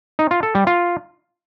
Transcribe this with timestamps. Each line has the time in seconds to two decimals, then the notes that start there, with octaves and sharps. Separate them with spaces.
0.19 D#4
0.31 F4
0.43 A4
0.55 G3
0.67 F4